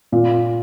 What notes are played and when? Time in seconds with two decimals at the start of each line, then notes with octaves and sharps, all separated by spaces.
0.12 A#2